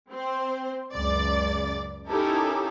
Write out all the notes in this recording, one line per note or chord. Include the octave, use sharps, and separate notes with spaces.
C4 C5
C#2 F#2 C#3 D5 A6
C#4 D#4 E4 G4 A4 A#4